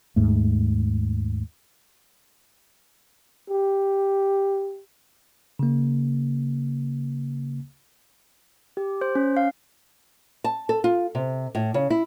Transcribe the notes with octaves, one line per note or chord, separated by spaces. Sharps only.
D#2 G#2 A3
G4
C#3 A#3
G4
C5
C#4
F5
A5
A4
F4
C3
A2
C#3
E4